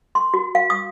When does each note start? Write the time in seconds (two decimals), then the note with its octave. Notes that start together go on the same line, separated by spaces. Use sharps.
0.15 C6
0.34 F#4
0.55 F5
0.70 D#6